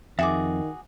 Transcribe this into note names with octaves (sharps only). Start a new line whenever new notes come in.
F2 D#3 F#4 G#4 E5 D6